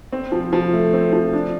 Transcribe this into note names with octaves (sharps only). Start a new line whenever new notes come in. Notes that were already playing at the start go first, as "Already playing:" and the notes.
C4
F3
F3
A3
C4
F3
D4